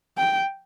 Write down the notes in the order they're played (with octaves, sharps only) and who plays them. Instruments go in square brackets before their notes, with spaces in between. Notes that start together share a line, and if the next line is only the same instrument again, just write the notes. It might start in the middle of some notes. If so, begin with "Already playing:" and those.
[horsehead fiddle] G5